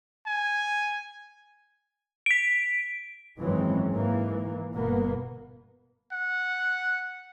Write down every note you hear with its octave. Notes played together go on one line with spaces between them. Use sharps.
G#5
B6 D7
G#1 F#2 E3 G#3 C4 C#4
G#2 E3 A#3
G1 B2 A#3 B3
F#5